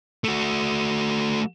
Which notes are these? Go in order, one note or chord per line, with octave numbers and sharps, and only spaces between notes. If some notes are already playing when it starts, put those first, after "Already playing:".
A3 F#4